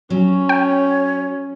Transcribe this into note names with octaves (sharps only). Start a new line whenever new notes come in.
F#3 C#4
C#5 G5